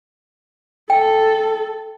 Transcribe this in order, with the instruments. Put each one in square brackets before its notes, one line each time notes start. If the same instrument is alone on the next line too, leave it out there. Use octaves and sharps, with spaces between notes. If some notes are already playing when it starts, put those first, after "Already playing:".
[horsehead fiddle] A4 [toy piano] G5